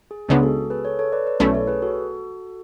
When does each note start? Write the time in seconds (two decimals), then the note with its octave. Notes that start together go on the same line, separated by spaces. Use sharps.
0.11 G#4
0.28 C#2 C#3 G#3 B3 D4 G#4
0.43 F#4 A4
0.70 G#4 B4
0.85 A4 C#5
0.99 A4 C#5
1.12 B4 D5
1.26 B4 D5
1.40 B1 B2 A3 C#4 E4 A4 C#5
1.54 A4 C#5
1.67 G#4 B4
1.82 F#4 A4